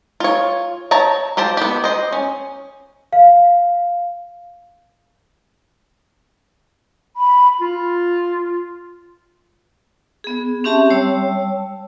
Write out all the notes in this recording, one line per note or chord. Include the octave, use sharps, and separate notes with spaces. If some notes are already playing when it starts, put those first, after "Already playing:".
F4 C#5
C#5 G5 A5 A#5
F4 G4 C5 A5
B3 G4
C5 D#5
C#4
F5
B5
F4
B3 G#4
C4 C#4 G4 E5 A5
G3 C#5 A5 E6